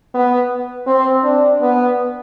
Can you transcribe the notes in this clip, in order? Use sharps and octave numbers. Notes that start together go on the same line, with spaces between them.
B3
C4
D4
B3